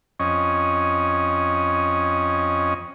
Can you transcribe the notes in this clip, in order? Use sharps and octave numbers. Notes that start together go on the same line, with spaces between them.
F2 C#4 D#5 C#6